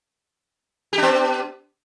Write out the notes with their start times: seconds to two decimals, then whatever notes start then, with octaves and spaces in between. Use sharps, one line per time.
0.93 G4
0.98 D4
1.03 B3